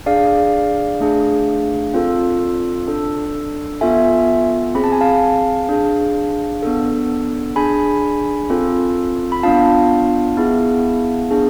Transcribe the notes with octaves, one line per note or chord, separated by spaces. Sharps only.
D4 G#4 D5 F5
A3 D4 G#4
C4 F4 A4
D4 A4
B3 F4 A4 E5 G#5
C4 G#4 B5
A5
G#5
F5 A5
D4 G#4
B3 D4 A4
D4 G#4 G#5 B5
C4 F4 A4
B5
B3 D4 F4 F5 A5
B3 E4 G#4
B3 D4 G#4